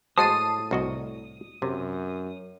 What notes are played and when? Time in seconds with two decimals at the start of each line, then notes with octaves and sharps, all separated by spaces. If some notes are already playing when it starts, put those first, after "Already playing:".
0.18 A2 G#3 F#4 C5 A5 D#6 C7 D#7
0.71 C2 F#4 D#5
1.62 F#2 C3